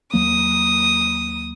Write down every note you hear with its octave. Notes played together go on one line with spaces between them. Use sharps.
D#2 F#3 A#3 D#6